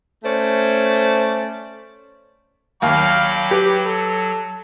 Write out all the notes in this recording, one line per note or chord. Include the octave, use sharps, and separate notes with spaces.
A3 C#4 C5 D5
D#2 F#3 F5 G5 B5 D6
G4 B4
A4